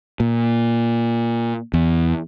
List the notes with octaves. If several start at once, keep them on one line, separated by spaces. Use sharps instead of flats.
A#2
E2